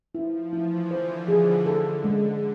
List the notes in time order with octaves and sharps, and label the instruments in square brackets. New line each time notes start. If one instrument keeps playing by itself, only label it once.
[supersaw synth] F3 [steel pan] E4
[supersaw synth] E3 [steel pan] E4
[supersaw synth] D3 [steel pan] C5
[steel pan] G#4
[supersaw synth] D3 [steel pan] A4
[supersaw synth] D3 [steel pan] G#3